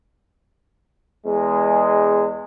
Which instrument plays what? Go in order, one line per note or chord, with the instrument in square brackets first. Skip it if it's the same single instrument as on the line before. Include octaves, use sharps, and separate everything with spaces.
[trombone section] E2 G#3